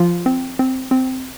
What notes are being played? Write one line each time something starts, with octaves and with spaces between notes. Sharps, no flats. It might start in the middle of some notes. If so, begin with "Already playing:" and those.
Already playing: F3 F4
C4
C4
C4